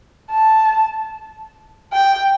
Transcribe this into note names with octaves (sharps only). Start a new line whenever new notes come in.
A5
G5